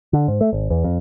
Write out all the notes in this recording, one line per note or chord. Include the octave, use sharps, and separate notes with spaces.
D3
G#2
A3
G#1
E2
F2